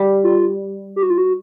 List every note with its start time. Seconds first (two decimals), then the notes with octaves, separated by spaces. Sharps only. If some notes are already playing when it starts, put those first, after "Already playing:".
Already playing: G3
0.24 F4
0.96 G4
1.03 F#4
1.10 F4
1.18 F#4